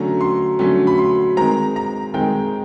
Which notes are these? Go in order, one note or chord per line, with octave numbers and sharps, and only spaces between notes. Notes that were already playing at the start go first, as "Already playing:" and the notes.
Already playing: D3 F#3 A3 C#4 A#5
C6
D3 F#3 A3 C#4
B5
C6
D#3 G#3 C4 A#5
A#5
D#3 G#3 C4 G5